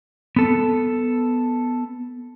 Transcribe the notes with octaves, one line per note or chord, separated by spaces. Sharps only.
B3 A4